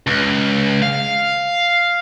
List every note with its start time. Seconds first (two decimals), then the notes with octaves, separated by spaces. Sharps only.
0.07 C#2
0.82 F5